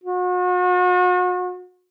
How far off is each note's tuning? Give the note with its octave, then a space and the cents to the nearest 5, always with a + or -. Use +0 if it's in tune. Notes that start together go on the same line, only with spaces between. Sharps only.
F#4 -40